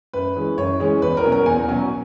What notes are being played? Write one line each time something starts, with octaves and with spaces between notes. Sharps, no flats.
F#2 B4
E3 G#3 C#4
F#2 C#5
E3 G#3 C#4
E2 B4
A#4
B2 F#3 C#4
A#4
E2 G#5
B2 F#3 C#4